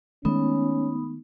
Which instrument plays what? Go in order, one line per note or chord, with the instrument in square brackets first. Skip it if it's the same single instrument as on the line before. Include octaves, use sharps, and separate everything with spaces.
[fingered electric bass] D#3 G#3 A3 [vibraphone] B3 D#4 [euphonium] C#4